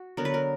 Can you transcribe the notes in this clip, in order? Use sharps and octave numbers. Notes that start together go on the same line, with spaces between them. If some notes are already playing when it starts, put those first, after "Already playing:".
Already playing: F#4
D3 F#3 B3 A#4
B4
A#4